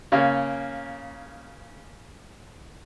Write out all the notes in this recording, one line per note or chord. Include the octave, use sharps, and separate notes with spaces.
C#3 A#3 C#4